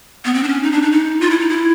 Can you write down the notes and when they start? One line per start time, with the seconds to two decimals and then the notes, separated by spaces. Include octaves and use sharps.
0.25 B3
0.34 C4
0.43 D4
0.48 C#4
0.63 D#4
0.72 D4
0.82 D#4
0.92 D#4
1.21 F4
1.30 E4
1.40 D#4
1.49 E4